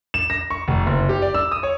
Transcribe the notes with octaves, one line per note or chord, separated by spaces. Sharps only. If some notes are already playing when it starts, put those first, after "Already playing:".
E7
A#6
C#6
F1
F#1
G4
D5
E6
D#6
C#5